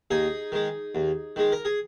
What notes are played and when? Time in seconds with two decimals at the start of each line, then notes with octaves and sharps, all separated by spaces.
0.11 D#2 D#4 G#4
0.52 D#3 G#3
0.95 D#2
1.36 D#3 G#3
1.52 A#4
1.65 G#4